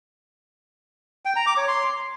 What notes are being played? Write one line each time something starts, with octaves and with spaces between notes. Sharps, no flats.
G5
A#5
D6
C#5
C6